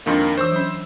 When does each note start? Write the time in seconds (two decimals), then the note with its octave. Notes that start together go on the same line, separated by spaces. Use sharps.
0.06 F2 D#3 G#3 A#3 D4
0.38 E3 C5 C#6 E6
0.51 F#3 C#4